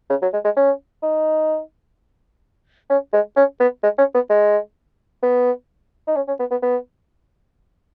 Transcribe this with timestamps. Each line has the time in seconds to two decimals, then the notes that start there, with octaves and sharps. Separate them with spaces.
0.10 C#3
0.22 F#3
0.33 G#3
0.45 G#3
0.57 C#4
1.03 D#4
2.90 C#4
3.13 G#3
3.36 C#4
3.60 B3
3.83 G#3
3.98 C#4
4.14 B3
4.29 G#3
5.23 B3
6.07 D#4
6.16 C#4
6.28 C#4
6.40 B3
6.51 B3
6.62 B3